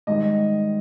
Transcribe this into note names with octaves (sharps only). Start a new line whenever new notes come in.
G#2 D#3 G3 D#5